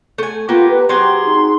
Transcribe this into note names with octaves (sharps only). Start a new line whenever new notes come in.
A3 G#5
A#3 B3 F4 G4
B4
F#3 C4 G4 G#4 C6
D#4